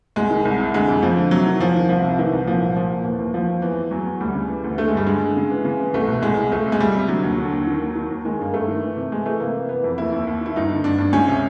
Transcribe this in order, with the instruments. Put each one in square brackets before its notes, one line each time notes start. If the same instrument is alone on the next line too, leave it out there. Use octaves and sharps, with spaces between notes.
[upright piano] C2 G#3
D#3
C2
C3
D3 G#3
F2
F2 F3
D3
C3 F#3
D#3
E2 F3
D#3
C2 F3
C3
D#3 E3
C2
A#2 F3
C2
A#2 F3
A#2
D#2 E3
D#2
D#2 F3
D#2
E2 E3
E2
E2 F#3
E2
D2 G3
C#3
E3
D2
D3 A3
G#3
G2 G3
D3 G#3
D3
C#3
E3
C#3
E3
C2 A3
B2
C2 G#3
C2
C#2 A3
C3
G#3
C#2 G3
C3
D3 F#3
D#2
D3
D#2
D#3
D#2
D#3
D#2
D#3 G#3
G2 A#3
G2 A3
D#3
E3
C3
C3 G#3
E3 A3
C3 A#3
E3
E3 B3
F2
D#2 E4
D#2
D#2
D#3 E4
G2 D#4
D3
G2 D4
G2
C#2 C#4
C3